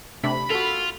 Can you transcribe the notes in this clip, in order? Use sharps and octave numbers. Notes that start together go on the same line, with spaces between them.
C3 A3 D4 B5
F4 F#4 A4